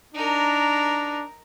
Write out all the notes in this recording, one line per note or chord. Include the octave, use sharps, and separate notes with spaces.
D4 D#4 A#4